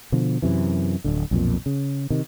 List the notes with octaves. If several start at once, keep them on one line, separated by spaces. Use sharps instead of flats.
B2 D3 F3
F#2 C3 E3
D1 D3
B1 F2 A#2
C#3
C3 D#3